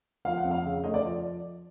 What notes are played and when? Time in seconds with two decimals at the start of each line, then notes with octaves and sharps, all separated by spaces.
0.25 F3 F5
0.38 F#5
0.44 F2
0.51 F5
0.65 C#3
0.84 A3 D#5
0.94 D5
1.03 F3